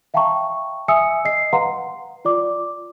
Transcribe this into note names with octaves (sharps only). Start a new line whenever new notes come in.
E5 F5 G5 A5 A#5 C#6
E5 G#5 D#6 E6 C#7
D#5 C7
B4 F5 F#5 A#5 C6
F4 D5 D6